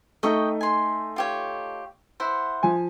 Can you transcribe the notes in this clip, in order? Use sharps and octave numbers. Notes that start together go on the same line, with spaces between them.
A3 D#4 D#5 G5 C#6
G#5 C6
F4 G4 C#5
E4 C5 F#5
F3 G#5